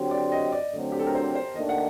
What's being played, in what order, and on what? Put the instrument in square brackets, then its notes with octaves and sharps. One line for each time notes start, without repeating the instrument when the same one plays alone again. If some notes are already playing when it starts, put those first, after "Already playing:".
Already playing: [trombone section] D3 F#3 C4 G4
[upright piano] D5
D#5
D5
[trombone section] D2 D3 F#3 C4
[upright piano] G4
A4
A#4
C5
C5
[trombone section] D#2 D#3 A3 D4 [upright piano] D#5
[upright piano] F#5